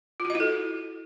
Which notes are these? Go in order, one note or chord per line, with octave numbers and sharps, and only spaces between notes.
F4
F#4
D#5
E4
A4